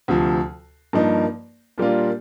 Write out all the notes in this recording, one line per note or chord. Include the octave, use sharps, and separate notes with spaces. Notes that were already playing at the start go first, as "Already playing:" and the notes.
D2 C3 F3
G2 F3 A#3 D#4
A#2 G3 A#3 D4 F4